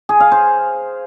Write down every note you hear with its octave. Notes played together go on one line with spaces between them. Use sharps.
G#4
F5
C5